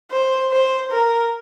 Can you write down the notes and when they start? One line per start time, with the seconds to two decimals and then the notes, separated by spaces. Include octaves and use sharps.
0.11 C5
0.52 C5
0.91 A#4